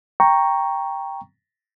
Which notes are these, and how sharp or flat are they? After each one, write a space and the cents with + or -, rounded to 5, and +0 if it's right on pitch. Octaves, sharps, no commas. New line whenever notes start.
G5 +5 A#5 +0 C#6 +0